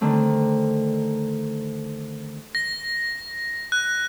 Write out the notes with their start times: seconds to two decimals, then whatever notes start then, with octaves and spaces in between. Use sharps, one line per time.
0.01 D3 D#3 A3 C4
2.55 A#6
3.72 F#6